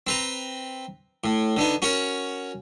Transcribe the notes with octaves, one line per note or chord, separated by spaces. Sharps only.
C4 B4 A#5
A2
D3 B3 D#4
C#4 F#4 A#4